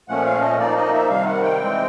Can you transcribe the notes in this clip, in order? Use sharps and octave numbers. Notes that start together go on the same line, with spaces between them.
A#2 F3 A3 C#4 F#5
F5
D#5
F3 A#3 D#4 D5
D#5
E5
C3 D#3 G3 F5
F#5
G5
E3 G#3 C4